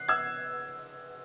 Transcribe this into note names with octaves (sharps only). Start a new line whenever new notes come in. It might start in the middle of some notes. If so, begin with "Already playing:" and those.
Already playing: F#6 C7
E6 G#6